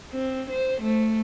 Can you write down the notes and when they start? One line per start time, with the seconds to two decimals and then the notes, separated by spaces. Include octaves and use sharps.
0.11 C4
0.50 C5
0.81 A3